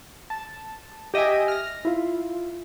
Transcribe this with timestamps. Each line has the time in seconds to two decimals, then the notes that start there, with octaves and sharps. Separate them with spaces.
0.30 A5
1.14 G4 D#5 E5 G5 G#5
1.48 F6 A#6
1.85 E4 F4